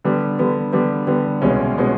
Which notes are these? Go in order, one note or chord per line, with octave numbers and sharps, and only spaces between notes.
D3 G3 B3
D3 G3 B3
D3 G3 B3
D3 G3 B3
C2 B2 G#3 C#4
B2 G#3 C#4